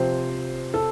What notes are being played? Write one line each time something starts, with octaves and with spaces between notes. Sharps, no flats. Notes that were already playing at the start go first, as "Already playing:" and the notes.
Already playing: C3 F3 C4 C5
A4